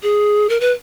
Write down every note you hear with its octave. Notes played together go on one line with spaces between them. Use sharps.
G#4
A#4
B4